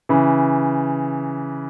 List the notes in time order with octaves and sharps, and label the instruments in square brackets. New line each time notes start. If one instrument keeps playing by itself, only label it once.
[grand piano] C#3 E3